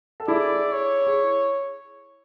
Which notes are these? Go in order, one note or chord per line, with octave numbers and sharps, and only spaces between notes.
A4
E4 G#4 D5
C#5
G#4